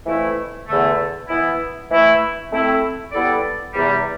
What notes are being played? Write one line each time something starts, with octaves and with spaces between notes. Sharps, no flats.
F2 E3 A3 E4
E2 D3 A3
E3 B3 E4
E3 A3 E4
A3 C4 E4
G3 B3 E4 A4 D5
E2 C3 G3